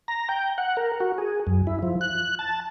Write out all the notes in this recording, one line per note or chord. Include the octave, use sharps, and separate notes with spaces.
A#5
G5
F#5
A#4
F#4
G#4
F#2
E4
F3
F#6
A5